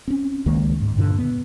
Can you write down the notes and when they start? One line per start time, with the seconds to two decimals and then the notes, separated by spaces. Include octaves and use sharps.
0.08 C4 C#4
0.46 C#2 D#3 G#3 A#3
0.81 G#2
0.97 G2 A#2 D3
1.19 B3